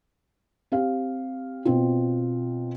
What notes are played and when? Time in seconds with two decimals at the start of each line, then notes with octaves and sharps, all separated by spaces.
0.72 C4 G4 F5
1.65 B2 C4 F4